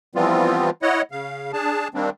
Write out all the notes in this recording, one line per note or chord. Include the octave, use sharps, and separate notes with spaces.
E3 F3 G3 B3 C4 F4
E4 C#5 D#5 F#5
C#3 F5
D4 G#4 A5
D#3 G3 A#3 C4 D4